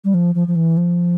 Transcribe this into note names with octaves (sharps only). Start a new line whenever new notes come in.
G3
F3
F3
F3
E3
F3